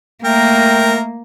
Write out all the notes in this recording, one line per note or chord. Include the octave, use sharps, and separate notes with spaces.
A3 A#3 A#4 G5